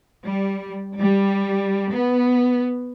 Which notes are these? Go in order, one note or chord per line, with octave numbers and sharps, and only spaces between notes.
G3
G3
B3